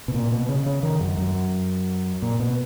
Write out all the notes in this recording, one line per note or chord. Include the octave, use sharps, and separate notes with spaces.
B2
A#2
B2
C#3
C#3
D#3
F#2
F#2
A#2
B2